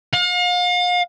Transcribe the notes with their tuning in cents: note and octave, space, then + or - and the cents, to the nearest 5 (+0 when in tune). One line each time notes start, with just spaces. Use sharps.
F5 +40